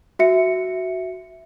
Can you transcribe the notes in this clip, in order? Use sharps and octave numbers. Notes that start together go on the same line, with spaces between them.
F#4 E5 C#7